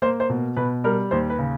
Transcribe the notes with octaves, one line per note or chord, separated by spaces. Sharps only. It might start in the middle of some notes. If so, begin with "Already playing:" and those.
A#3 C5
C5
B2
B2 B4
G3 A#4
D#2 C5
B4
C#3